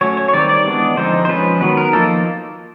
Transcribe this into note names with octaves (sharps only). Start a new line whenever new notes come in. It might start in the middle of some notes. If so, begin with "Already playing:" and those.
F#3 A3 C#4 C#5
C#5
C#5
D#3 G3 C4 D5
D5
E3 G#3 B3 D4
D3 F3 G#3 C4 D#4 C5
C5
F3 G#3 C#4 B4
D#3 F#3 B3 B4
A#4
F3 A#3 D#4 A4